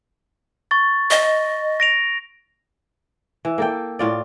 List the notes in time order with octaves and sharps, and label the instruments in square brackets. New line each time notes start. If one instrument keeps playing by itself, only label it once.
[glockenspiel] C#6 A6
[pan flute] D#5
[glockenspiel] A#6 D7 F7
[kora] E3
A#3 A4 G5
A2 F4 D5